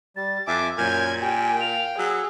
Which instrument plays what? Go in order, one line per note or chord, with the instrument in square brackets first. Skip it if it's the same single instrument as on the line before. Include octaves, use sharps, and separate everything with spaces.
[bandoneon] G3 [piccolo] A6
[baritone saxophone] F2 [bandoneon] E5 G#5 [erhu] D6
[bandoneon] F#2 G#5 F6 [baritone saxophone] A#2 [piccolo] G6 [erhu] G#6
[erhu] G4 [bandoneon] G5 [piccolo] G#5
[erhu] F5 [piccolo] F7
[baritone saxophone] F#3 [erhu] G#4 [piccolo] E6